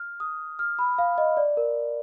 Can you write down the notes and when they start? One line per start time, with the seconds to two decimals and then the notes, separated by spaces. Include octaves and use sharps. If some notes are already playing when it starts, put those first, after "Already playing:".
Already playing: F6
0.20 D#6
0.59 F6
0.79 B5
0.98 F5
1.18 D#5
1.37 D5
1.57 A#4